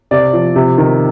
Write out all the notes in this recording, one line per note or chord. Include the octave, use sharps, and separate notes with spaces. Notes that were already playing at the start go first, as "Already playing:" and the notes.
C3 D5
F3
C3
D#3